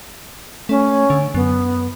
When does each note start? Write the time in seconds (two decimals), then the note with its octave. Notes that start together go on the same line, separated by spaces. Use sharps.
0.69 A3 C#4
1.10 D3
1.34 F#2 B3